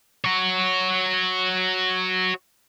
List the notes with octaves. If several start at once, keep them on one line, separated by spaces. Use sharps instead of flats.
F#4 C#5